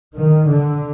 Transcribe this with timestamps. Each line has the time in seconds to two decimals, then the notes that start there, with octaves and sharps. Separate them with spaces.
0.16 D#3
0.50 D3